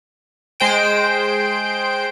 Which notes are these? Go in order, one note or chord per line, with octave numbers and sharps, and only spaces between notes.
G#3 C5 G5 D7